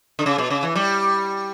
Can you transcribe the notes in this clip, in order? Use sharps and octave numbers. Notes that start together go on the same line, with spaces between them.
D3
C#3
B2
C#3
E3
G3